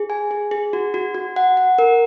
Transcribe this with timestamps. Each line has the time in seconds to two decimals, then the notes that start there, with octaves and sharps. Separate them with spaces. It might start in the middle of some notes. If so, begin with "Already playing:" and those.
Already playing: G#4
0.10 G#5
0.31 G#4
0.51 G#4
0.73 F#4
0.94 F#4
1.15 F#4
1.36 F#5
1.57 F#5
1.79 A#4